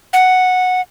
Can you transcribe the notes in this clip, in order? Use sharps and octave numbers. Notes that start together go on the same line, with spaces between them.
F#5